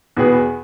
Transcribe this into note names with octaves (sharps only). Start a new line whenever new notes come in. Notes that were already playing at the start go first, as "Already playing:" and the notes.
E2 B2 B3 G#4 B4